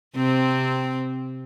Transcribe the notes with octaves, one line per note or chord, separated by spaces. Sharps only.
C3 C4